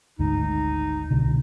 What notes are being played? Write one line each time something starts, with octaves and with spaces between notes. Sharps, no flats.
G#1 D2 G#2 D#4
C2 B2 D3